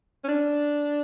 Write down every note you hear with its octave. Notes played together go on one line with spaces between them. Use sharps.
C#4
D4